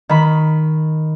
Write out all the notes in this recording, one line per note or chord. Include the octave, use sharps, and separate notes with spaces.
D#3 B5